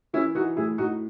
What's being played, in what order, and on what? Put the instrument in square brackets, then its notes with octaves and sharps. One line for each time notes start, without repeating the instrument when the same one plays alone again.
[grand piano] E3 C#4 E4
E3 D#4 F#4
A2 E4 G#4
A2 D#4 F#4